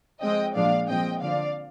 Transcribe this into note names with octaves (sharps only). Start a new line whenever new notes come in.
F3 G#3 C4 D#5 G5
A#2 F3 G#3 D4 D5 F5
A#2 F3 G#3 C4 D#5 G5
D3 F3 C4 D5 F5